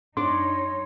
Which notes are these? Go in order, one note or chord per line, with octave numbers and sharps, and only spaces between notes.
F#2 D4 D#4 C#5 D5 C6